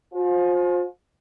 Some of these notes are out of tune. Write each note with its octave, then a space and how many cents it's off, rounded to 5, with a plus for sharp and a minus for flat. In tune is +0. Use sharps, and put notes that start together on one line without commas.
F4 +35 C5 +15 G#5 +45